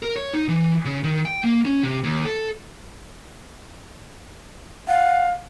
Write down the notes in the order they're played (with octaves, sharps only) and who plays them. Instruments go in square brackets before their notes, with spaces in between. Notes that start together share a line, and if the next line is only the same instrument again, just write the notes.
[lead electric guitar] A#4
C#5
D#4
E3
C#3
D#3
G5
A#3
C#4
C3
D#2
A4
[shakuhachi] F5 [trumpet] F#5